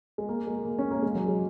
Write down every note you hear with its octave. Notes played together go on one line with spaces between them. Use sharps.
G#3
A#3
G#3
A#3
C#4
A#3
G#3
F#3
G#3